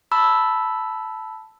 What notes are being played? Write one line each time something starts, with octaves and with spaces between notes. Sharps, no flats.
A5 B5 E6